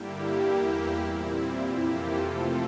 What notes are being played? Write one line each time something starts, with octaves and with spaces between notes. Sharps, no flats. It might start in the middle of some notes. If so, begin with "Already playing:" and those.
Already playing: G2 D3 G3 A#3 E4 G4
E2 E3 A#3
A#2 G3 C4 E4
F4
F2 C3 E3 A#3 E4 G4
F4 A4
C3 F3 A3 C4 F4 A4